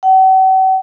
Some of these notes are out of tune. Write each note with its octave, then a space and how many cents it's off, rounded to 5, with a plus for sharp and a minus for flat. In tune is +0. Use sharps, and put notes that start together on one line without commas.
F#5 +45